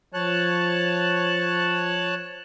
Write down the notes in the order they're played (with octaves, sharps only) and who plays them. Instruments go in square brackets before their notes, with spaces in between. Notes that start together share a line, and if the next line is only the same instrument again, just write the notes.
[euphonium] F3 [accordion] C#5 A5 F#6